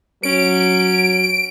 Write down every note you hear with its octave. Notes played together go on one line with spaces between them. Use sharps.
F#3 C#4 D7